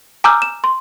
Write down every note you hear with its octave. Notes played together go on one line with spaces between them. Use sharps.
G#5 A#5 D6 E6 F6 G6
E7
C6